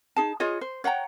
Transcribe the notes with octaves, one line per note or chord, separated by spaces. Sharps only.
D#4 G#4 A5
F4 G#4 C#5 D#5
C5
C#5 F#5 G5 A#5